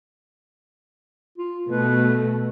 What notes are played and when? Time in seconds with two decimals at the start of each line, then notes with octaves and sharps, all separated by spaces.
1.38 F4
1.68 B2 A3 B4